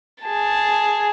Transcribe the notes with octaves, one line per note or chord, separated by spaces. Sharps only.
G#4 A5